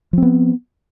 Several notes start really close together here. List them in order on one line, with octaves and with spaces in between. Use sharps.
F3 C4 B3